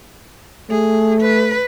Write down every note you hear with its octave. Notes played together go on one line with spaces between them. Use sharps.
A3 G#4
B4